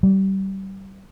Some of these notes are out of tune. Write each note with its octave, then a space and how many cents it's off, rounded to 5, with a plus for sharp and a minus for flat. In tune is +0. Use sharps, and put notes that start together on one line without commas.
G3 -25